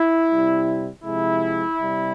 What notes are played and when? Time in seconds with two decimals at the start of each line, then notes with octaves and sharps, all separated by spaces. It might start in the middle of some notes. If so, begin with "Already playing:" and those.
Already playing: E4
0.31 C3 G3
1.04 C3 F3 G#3 E4
1.79 C3 G3